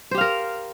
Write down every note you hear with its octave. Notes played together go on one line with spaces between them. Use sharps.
G4 A#4 C5 F5